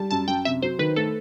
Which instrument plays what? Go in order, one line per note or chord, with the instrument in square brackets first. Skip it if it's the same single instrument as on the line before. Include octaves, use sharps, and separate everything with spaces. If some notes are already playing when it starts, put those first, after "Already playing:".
Already playing: [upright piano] G3 [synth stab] A5
[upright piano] F#2 [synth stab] A5
[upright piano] F#2 [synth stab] G5
[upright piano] C3 [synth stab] E5
[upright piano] F#3 [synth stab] C5
[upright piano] D#3 [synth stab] B4
[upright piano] A3 [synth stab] A4